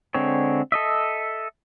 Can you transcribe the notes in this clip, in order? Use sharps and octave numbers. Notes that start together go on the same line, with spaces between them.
D3 G#3 C4 C#5
A4 D#5 E5